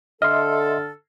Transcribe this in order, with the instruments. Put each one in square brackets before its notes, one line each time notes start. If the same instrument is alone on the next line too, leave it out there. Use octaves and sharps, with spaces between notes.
[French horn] D3 [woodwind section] A4 [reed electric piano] D#5 E5 C6 [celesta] F6